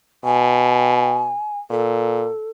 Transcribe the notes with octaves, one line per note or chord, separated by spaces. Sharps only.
B2 G#5
A#2 A4